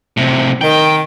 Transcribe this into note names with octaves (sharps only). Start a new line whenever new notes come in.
A2 C3
D#3 G5